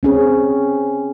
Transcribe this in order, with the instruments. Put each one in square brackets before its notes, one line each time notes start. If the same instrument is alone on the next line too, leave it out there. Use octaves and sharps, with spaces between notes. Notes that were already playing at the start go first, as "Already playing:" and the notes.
[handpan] C4 C#4 G#4